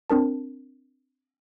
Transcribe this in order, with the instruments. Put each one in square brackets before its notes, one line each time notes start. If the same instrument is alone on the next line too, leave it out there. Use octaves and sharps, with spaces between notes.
[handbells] C4 D4 A#4 A5